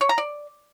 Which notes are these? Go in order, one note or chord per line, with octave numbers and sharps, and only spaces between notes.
C#5
A#5
D5